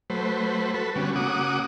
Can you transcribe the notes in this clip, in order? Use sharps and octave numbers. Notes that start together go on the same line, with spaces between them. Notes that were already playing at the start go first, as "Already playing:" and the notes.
F#3 A3 B4 C5
F#4 A4 B4
D3 G3 B3 C#4 F#4
C#3 A#3 F#4 F#5 D6 D#6